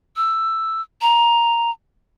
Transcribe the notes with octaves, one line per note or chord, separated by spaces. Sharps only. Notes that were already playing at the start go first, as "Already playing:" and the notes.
E6
A#5